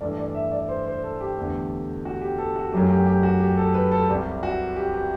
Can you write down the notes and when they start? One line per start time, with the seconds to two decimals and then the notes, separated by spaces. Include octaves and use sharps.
0.01 G2 E3 A3 D5
0.18 D5
0.35 E5
0.52 D5
0.69 C5
0.86 C5
1.03 A4
1.21 G4
1.37 E2 D3 A3
2.05 F#4
2.22 G4
2.38 A4
2.56 F#4
2.72 F#2 F#3 A3 G4
2.90 G4
3.06 G4
3.23 F#4
3.40 G4
3.57 A4
3.74 B4
3.91 A4
4.08 C2 C3 G3 G4
4.43 F#4
4.76 G4
4.94 G4